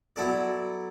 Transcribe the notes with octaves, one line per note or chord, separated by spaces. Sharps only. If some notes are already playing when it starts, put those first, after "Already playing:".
F#3 B3 E4 A4 D5